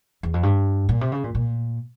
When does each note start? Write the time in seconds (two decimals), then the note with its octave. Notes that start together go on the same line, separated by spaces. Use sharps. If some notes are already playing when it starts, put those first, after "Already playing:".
0.23 E2
0.34 F2
0.43 G2
0.89 A#2
1.01 C3
1.12 C#3
1.24 A#2
1.35 A#2